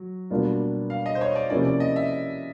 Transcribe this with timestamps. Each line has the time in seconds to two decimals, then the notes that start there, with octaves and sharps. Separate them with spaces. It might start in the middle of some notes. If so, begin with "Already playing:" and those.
Already playing: F#3
0.30 B2 G3 A#3 D4 F4
0.90 F5
1.06 D#5
1.15 C5
1.21 C#5
1.36 D5
1.50 C3 F3 A#3 C#4 E4 D5
1.65 D5
1.80 D#5
1.96 E5